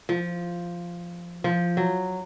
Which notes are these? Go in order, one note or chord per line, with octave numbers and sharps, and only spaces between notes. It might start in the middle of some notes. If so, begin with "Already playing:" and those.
F3
F3
F#3